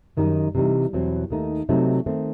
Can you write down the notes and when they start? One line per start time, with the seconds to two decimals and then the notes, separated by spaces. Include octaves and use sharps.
0.17 F#2 D#3 G3 D#4
0.55 C3 E3 G3 D#4
0.93 E2 B2 F#3 C4
1.30 D#2 D#3 A3 D#4
1.69 C3 F#3 A3 C4 D#4
2.06 D#3 A3 C4